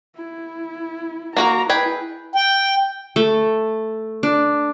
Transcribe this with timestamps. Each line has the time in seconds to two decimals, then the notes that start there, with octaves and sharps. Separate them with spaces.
0.16 E4
1.37 A#3 F#4 A#4 A#5
1.69 E4 G#4 B4 G5
2.36 G5
3.16 A3
4.23 D4